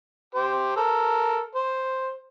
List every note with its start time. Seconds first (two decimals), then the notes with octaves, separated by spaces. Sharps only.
0.35 G4 C5
0.77 A4 A#4
1.55 C5